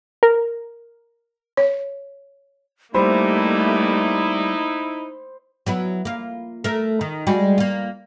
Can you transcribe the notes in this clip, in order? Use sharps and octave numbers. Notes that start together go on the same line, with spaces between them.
A#4
C#5
G3 A3 A#3 D#4 E4 C5 B5
F#3 B3 E4
A#3 F4
A3 A#4
D#3
G3 G#3 F#4
A#3 F4